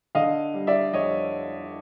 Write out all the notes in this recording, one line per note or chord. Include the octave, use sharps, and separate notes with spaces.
D3 D#5 F5
G3
D5 E5
F2 C#5 D#5